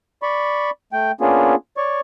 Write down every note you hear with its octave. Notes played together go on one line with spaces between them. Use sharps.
D5 B5 C#6
A3 G5
A#3 B3 C#4 D4 F4 G#4
C#5 D5 C#6